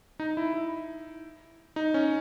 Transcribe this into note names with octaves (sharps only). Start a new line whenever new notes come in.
D#4
E4
E4
D#4
C#4